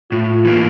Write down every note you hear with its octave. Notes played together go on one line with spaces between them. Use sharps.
A2 F4
E3 A#3